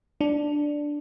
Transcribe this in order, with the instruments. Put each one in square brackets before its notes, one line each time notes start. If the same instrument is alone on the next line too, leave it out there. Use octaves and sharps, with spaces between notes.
[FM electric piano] D4